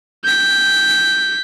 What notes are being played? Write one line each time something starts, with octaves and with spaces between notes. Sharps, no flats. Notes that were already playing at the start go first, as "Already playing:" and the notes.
G6 B6